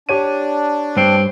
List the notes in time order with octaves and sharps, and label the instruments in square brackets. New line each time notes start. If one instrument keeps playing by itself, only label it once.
[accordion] D4 [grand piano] G4 C#5 D#7
[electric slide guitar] G2 [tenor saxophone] C4